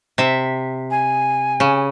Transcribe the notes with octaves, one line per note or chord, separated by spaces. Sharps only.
C3 E5
G#5
C#3